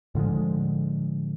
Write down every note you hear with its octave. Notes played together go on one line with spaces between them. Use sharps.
A2 D3 F3 G#3